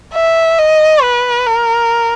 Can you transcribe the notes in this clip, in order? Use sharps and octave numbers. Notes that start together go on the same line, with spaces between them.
E5
D#5
B4
A#4